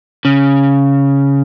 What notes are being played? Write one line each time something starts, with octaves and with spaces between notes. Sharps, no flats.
C#3